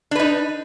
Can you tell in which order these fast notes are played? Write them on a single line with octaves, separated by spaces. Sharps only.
D4 B4 D#4